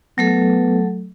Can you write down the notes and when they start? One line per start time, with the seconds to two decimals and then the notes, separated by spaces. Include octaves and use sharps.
0.18 F#3 A3 B3 A4